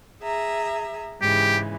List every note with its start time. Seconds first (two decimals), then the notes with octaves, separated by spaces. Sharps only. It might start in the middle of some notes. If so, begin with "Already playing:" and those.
0.21 G#4 E5 A#5
1.21 G#2 C#3 E3 G4